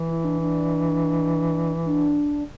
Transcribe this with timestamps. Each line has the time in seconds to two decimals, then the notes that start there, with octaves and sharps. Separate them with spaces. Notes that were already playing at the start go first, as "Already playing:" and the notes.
Already playing: E3
0.09 E4
0.25 D4
0.41 D4
1.85 D4